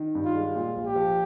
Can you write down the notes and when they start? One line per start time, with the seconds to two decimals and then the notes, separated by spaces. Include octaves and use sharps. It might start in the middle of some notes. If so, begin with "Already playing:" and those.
Already playing: D#3
0.15 G2
0.25 F4
0.35 G#3
0.55 A#2 F4
0.76 A#1
0.86 G4
0.96 F3